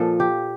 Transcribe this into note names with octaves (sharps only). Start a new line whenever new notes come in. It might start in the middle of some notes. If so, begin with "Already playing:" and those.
Already playing: A#2 F3 A4
G4